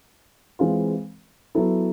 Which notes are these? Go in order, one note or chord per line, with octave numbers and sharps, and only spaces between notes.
E3 G#3 C4 F4
F#3 B3 E4 A4